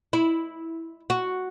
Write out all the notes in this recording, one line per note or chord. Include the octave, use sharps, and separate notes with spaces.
E4
F#4